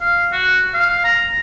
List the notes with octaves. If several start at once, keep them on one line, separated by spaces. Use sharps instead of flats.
F5
F#4
F5
A#5